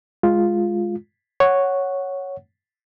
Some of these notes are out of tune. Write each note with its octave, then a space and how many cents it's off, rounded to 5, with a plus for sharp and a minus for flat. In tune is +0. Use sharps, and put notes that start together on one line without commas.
G#3 +0 F4 +0
C#5 +0 F#5 +0